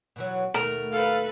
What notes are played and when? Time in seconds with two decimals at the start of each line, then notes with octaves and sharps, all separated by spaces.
0.16 B2 E3 F#3
0.54 D#2 B2 A3 A#4
0.93 A4 B4 F5